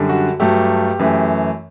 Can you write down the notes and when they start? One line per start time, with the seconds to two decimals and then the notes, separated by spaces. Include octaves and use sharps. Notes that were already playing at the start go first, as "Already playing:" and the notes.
Already playing: F#2 D3 G3
0.09 F#4
0.40 G2 F#3 A3 G4
0.99 F#2 E3 A3